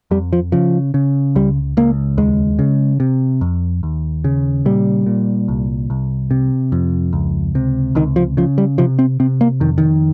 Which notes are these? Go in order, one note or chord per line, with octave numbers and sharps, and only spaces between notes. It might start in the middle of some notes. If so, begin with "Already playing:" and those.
F2 G3
F3
C#3 F3
C#3
C#2 G3
C#2 A#3
D#2 G#3
C#3
C3
F2
D#2
C#3
A#2 G3
A#2
C2
C2
C3
F2
C#2
C3
C#2 D#3
F3
C#3 F3
G3
C3 F3
C4
C3 C4
A#3
F2 D#3
D#3